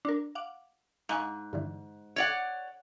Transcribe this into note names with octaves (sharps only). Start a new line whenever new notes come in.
D4 A#4
F5 F#5 D6
G#2 F5 G#5 C#6
G2 D3 E3
C#5 D5 F#5